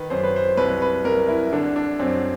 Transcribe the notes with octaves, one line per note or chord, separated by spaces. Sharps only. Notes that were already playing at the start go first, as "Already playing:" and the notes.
Already playing: D#3 B4
F#2 C5
B4
C5
C2 B4
B4
C2 A#4
E4
D3 D4
D4
F#2 C4